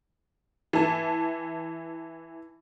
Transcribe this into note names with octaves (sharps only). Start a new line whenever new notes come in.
E3 A5